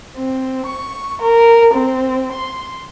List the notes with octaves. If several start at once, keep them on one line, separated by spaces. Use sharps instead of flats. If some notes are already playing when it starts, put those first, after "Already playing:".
C4
C#6
A#4
C4
C6